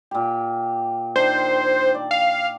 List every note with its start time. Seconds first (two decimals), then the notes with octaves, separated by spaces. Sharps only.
0.11 A#2 G4
1.16 D#3 D4 C5
1.94 D5
2.11 F5